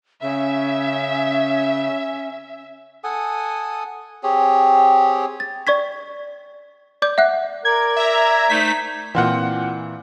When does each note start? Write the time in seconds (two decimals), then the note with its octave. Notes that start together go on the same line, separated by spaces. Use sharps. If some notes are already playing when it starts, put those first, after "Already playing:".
0.23 C#3 C#4 E5
3.04 A4 F#5 G#5 D#6
4.23 C4 G4 G#4 C#5
5.40 A6
5.67 D5 C#6 G#6 B6
7.02 D5 D6 G6
7.18 E5 F#5 F#6
7.65 A#4 D5 G#6
7.97 E5 A#5
8.49 A3 D#4 C5 B6
9.15 A#2 E3 C4 F4 F#5